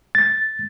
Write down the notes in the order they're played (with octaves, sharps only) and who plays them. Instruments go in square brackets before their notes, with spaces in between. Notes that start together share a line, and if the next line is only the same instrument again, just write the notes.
[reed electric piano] A6